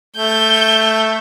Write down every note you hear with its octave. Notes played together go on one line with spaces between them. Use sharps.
A3 G6